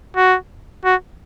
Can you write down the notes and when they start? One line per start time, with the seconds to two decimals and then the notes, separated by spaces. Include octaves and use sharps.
0.17 F#4
0.85 F#4